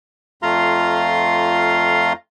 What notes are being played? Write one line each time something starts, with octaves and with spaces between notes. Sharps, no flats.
F2 A3 F4 F5 A#5 C6